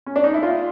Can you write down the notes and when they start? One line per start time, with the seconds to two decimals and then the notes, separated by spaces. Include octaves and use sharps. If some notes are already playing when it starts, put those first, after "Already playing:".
0.07 C#4
0.16 D4
0.24 D#4
0.34 E4
0.43 F4